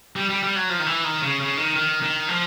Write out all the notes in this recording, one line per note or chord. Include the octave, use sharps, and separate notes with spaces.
G3
G3
G3
F#3
F3
D#3
E3
D#3
C#3
C#3
D#3
D#3
D#3
F3